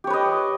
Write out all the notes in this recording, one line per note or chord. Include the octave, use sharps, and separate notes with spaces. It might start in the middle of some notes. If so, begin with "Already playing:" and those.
G4 B4 C#5 D#5